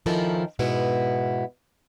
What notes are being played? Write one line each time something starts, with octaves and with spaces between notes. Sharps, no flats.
D#3 F3 C#4 E4 A4 A#4
G#2 B2 B3 E4